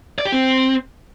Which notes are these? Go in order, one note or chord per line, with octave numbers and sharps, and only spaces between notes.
D5
G4
C4